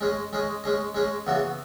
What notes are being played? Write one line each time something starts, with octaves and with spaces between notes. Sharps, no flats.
G#3 C#4 G#4 D#5
G#3 C#4 G#4 D#5
G#3 C#4 G#4 D#5
G#3 C#4 G#4 D#5
E2 C#3 E3 B3 F#4